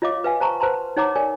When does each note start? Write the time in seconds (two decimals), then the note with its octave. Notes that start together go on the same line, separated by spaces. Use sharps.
0.02 F4 C#5 D#5 F5 D6
0.24 B4 E5 F5 G#5
0.40 C5 A5 A#5 C#6
0.60 B4 C5 F#5 A5 A#5 C6
0.97 D#4 C#5 F#5 A#5 D6
1.16 A#4 C#5 D5 G#5